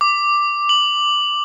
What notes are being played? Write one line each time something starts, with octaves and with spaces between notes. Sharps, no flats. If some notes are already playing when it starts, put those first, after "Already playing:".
D6
F#7